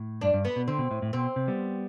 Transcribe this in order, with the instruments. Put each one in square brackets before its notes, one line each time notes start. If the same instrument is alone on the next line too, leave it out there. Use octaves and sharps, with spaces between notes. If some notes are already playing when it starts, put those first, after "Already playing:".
Already playing: [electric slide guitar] A2
[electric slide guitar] G2 [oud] D4
[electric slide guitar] G2
[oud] B3
[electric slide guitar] B2
[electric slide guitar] D3 [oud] C4
[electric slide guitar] B2
A2
A2
[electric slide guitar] B2 [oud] C4
[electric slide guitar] C3
G3 B3